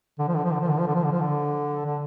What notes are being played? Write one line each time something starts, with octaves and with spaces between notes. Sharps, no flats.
D3
F3
D3
F3
D3
F3
D3
F3
D3
F3
D3
F3
D3
D3